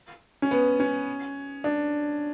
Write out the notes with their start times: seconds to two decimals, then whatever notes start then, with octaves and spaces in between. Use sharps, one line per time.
0.42 C#4
0.51 B3
0.80 C#4
1.64 D4